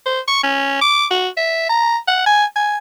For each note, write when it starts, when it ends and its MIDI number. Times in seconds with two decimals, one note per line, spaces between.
0.06 0.19 72
0.28 0.42 85
0.43 0.78 61
0.81 1.05 86
1.11 1.28 66
1.37 1.69 76
1.69 1.96 82
2.07 2.22 78
2.26 2.45 80
2.56 2.78 80